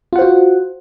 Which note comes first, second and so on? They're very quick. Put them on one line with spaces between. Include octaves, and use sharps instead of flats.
F4 F#5 C5 F#4